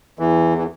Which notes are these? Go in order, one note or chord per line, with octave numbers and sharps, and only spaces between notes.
E2 E3
E3